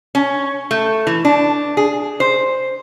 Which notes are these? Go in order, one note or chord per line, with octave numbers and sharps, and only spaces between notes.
C#4
A3
E3
D4
G#4
C5